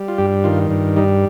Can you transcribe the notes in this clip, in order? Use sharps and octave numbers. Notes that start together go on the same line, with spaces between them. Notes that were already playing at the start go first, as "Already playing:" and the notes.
Already playing: G3
F4
G2 G4
D#3 F4
G2
G3 D#4